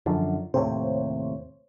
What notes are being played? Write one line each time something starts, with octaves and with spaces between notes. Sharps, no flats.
F#2 D3 F3
D#2 A2 C3 C5 C#5